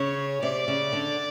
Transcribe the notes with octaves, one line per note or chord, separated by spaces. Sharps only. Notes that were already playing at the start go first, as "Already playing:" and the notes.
Already playing: C#3 C#5
C3 D5
C#3
D3